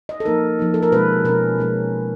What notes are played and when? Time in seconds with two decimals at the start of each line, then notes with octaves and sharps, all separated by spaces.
0.09 D#5
0.20 A4
0.25 F3 A#3 D#4 A#4
0.59 F3 A#3 D#4
0.74 A4
0.83 A#4
0.92 B2 G#3 C#4 B4
1.25 B2 G#3 C#4 A#4
1.58 B2 G#3 C#4